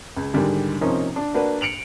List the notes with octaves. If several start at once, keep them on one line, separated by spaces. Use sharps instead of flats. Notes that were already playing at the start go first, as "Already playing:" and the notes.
C#2
G#2 D3 D#3 G3
C3 F3 A#3 C#4 D#4
D4
A#3 D4 F#4 B4 D5
C#7 D7 F7 F#7